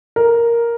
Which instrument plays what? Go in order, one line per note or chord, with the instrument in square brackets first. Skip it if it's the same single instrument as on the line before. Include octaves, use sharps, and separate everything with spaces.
[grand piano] A#4